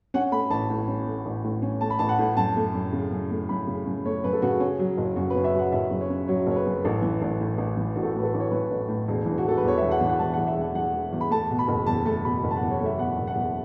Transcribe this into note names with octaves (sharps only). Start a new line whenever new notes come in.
C#4 F#5
A3 B5
A1 A5
A2
C#4
A3
A1
A2
C#4
A3 A5
B5
A1 A5
F#5
A2
F#2 A5
A3
F#2
C#3
F#2
A3
F#2 B5
C#3
F#2
A3 C#5
F#2 B4
A4
C#3 F#4
C#4
F#3
F#1
F#2 F#4
B4
C#4
E5
F#3 F#5
F#1 E5
F#2
C#5
C#4
F#3 C#5
F#1 C#5
B4
F#2
A1 A4
E3
A1
A2
A1
E3
A1 F#4
A4
F#4
A2 B4
A4
A1
C#5
E3 B4
A1
A2
E1
E3
F#4
E1 A4
B4
E2 C#5
E5
E1
F#5
E3
F#5
E1 A5
F#5
E2
E5
E1 F#5
E3 F#5
E1
E2
B5
A3 A5
B2
B5
F#1
E2 A5
A3 A5
B2 B5
F#1
A5
F#5
E2
C#5
A3 E5
B2 F#5
F#1
F#5
E2